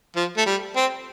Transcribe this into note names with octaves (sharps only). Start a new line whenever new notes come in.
F3
A3
G3
C4